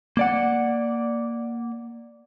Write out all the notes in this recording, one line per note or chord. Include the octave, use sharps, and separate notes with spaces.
A#3 D5 F#5